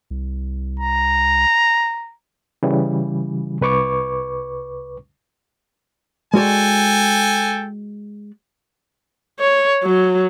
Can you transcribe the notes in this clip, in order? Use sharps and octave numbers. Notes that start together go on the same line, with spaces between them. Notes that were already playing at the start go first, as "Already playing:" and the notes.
C2
A#5
C#3 E3 G3
C2 B4 C#6 D6
G#3 F#4 A4 D5 G5 G#5
C#5
F#3